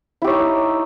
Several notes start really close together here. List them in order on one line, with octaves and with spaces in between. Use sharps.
E4 G4 C#5 D#4